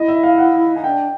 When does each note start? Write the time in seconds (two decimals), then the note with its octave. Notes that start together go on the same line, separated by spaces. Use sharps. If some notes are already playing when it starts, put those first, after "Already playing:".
Already playing: E4 D#5
0.08 E5
0.23 F5
0.38 F#5
0.76 D#4 G#5
0.84 D4 G5